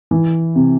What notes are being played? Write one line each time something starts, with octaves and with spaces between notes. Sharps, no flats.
E3
C3